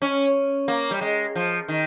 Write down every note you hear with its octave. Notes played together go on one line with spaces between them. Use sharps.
C#4
A#3
G3
G#3
F3
D#3